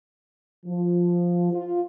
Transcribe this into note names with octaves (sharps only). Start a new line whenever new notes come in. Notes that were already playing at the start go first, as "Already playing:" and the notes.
F3
F4